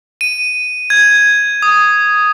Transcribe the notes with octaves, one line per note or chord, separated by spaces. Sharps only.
D#7
G#6
D#6